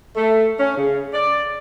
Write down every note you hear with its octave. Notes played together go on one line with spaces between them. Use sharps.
A3
C#4
C#3
D5